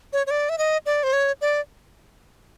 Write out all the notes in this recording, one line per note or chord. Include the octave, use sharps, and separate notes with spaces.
C#5
C#5
D5
E5
D#5
D5
C5
C#5
D5